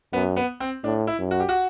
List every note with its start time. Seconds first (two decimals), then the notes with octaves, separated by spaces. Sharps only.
0.13 F#2 B3
0.36 B3
0.60 C4
0.84 A2 D4
1.07 E4
1.18 F#2
1.31 F#4
1.40 G4
1.49 F#4